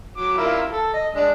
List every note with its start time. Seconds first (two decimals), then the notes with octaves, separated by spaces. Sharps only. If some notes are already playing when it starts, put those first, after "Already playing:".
0.17 F#3 D6
0.37 E4 F4 A#4
0.72 A4
0.93 D#5
1.15 G#3 D4